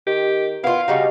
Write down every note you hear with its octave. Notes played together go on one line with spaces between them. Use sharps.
D#3 G4
B3 E4 F4 F5
C#3 G3 D#4 F#4